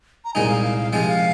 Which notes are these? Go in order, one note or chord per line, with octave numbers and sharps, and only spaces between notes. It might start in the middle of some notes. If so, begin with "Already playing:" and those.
A#5
C2 A#2 G#3 D#4 G#5
F5
F5
F5
C3 F3 G#3 G#5
F5